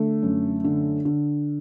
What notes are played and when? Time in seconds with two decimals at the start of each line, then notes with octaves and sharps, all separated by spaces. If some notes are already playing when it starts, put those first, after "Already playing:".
Already playing: D3 A3
0.23 F#2
0.64 D3
1.05 D3